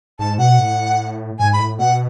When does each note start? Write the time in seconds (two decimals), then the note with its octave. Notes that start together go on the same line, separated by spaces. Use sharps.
0.19 G#2 A5
0.38 B2 F#5
0.58 A2
1.39 G#2 G#5
1.53 B5
1.59 A2
1.79 B2 F#5